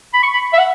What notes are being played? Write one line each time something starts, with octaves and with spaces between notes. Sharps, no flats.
B5
C#6
B5
E5
F#5